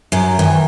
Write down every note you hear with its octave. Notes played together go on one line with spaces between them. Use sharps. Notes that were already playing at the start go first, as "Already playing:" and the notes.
F#2 F#3
D#3 E3